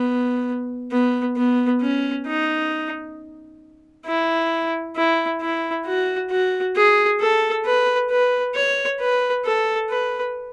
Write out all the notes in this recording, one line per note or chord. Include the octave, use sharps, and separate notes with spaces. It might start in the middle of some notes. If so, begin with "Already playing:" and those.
Already playing: B3
B3
B3
C#4
D#4
E4
E4
E4
F#4
F#4
G#4
A4
B4
B4
C#5
B4
A4
B4